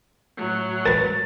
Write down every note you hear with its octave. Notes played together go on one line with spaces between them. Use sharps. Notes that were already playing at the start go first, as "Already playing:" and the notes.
A2 F#3
A#4 B4 A6